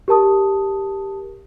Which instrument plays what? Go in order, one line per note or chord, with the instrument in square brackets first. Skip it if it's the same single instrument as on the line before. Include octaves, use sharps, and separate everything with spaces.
[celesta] G4 A#4 A5 D#6